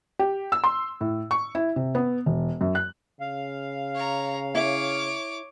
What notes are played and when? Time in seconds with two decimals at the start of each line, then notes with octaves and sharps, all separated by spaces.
0.19 G4
0.52 E6
0.64 C6
1.01 A2
1.31 C#6
1.55 E4
1.76 C3
1.95 B3
2.26 E1
2.61 F#2
2.75 F#6
3.21 C#3 F5
3.95 C#5 A#5
4.55 E4 C#5 E5 D6